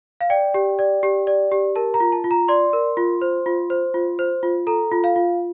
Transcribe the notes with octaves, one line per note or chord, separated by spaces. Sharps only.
F5
D5 G5
G4
D5
G4
D5
G4
A#4 A5
A#5
F4
A5
F4
A#5
D5 C6
A#4
F4
C5
F4
C5
F4
C5
F4
A4 A#5
F4
F5
F4